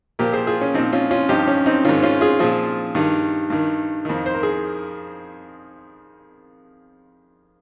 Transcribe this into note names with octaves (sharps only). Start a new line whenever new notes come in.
A#2 F3 G4 A#4
G#4 C5
F4 G#4
C#4
A#2 F3 C4 D#4
C#4 F4
C#4 F4
G2 F3 D#4 G4
C#4
C4 D#4
G#2 D#3 C#4 F4
C#4 F4
F4 G#4
A#2 F3 F4 G#4
G2 D#3
G2 D#3
F2 D#3
C5
A#4
G#4